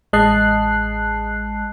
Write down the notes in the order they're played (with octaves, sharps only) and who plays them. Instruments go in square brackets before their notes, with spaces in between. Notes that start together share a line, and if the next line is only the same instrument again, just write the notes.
[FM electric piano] A1 G#3 D#5 A5 F#6 C7